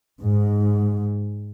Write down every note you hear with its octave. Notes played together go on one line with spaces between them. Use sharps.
G#2